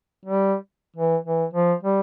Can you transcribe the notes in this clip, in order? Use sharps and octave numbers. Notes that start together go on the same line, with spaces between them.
G3
E3
E3
F3
G3